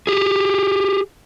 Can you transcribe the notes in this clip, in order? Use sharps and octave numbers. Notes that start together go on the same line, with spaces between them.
G4 G#4